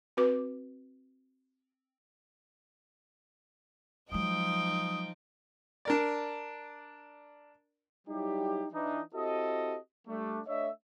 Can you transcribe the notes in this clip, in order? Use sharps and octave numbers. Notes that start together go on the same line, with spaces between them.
C4 F#4 B4 D6
F3 F#3 G#3 D#4 G5 D#6
D4 A#4 D5
F#3 G3 D#4 E4 G4
E3 D4 D#4
C4 E4 F#4 G4 A4 D#5
G3 A3 D4
A3 D4 C#5 D#5 E5